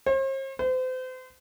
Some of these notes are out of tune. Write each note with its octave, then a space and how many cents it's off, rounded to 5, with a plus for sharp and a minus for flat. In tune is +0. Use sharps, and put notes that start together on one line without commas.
C5 +45
C5 -35